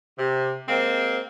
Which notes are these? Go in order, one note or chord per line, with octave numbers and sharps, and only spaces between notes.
C3
G#3 A#3 C4